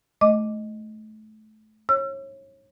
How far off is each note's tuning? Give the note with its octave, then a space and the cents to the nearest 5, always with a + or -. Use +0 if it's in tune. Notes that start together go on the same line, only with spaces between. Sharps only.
A3 -25 D#5 +0 D6 +0
C#5 -30 E6 +40